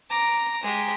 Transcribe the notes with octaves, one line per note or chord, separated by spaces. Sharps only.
A#5 D6
G#3 G4